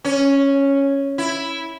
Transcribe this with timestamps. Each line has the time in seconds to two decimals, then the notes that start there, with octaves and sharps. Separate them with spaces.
0.04 C#4
1.18 E4